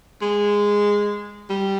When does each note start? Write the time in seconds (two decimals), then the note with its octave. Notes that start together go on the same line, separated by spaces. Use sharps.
0.22 G#3
1.50 G3